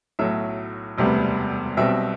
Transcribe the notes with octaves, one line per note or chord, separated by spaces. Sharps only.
B1 A2 F#3 E5
E1 D2 C3 G3 B3
B1 B2 G3 C4 E5